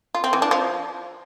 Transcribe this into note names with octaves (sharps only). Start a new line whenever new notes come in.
F4
C4
E3
D4
F3